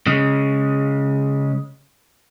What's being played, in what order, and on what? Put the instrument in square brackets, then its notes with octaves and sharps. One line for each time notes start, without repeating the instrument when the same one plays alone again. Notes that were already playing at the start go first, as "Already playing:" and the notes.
[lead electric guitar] C#3 G#3